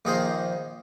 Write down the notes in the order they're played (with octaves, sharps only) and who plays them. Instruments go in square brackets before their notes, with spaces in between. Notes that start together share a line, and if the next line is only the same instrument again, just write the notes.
[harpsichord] A#1 D#3 G#4 A#4 C5 C6